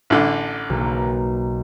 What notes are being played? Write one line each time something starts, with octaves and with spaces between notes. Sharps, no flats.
A1 D3
B1 A#3